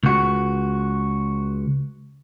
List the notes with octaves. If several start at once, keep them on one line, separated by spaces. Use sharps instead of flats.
C#2 F#4